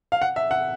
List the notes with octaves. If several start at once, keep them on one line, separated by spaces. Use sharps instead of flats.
F5
F#5
E5
F#5